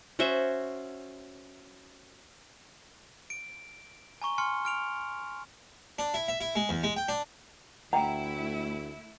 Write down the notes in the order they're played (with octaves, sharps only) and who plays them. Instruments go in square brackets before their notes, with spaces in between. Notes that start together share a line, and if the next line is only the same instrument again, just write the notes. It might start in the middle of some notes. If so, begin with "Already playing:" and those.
[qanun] C#4 F#4 C5 E5
[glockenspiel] D7
G#5 A#5 C#6 G7
G#5 C6 F6 C#7
F6 D7 F7
[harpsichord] D4
E4
E5
E4
G#3
E2
G#3
G5
D4
[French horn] D2 [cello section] A3 E4 [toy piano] F#5 G5 [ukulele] A#5